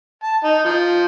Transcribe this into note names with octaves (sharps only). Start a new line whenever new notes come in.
A5
D#4
F3